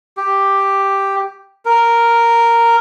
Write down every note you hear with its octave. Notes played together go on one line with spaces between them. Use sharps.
G4
A#4